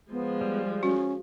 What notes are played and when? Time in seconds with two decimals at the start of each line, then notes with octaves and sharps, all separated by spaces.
0.12 F3 G#3 B3
0.41 G3
0.83 C#4 F#4